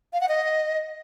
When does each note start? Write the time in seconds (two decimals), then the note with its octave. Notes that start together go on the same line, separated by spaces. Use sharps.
0.13 F5
0.21 F#5
0.28 D#5